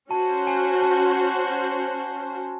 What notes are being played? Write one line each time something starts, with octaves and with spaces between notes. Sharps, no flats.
C#4 F#4 C5 A5
G#5
A5